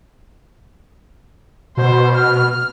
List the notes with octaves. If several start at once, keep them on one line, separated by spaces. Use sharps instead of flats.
B2 C5
F6